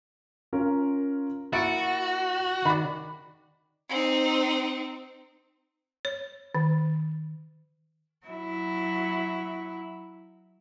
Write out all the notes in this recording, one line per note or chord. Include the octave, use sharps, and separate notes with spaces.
C#4 F4 A#4
A#3 E4 F#4 A6 C#7 D7
D#3 D5 B5
C4 D#4
C#5
D#3
F#3 E4